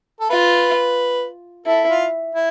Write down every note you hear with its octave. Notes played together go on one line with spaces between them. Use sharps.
A4
F4 B4
E4 A4
F4
E4